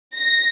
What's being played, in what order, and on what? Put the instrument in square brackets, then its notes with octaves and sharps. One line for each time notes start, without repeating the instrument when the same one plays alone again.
[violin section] A#6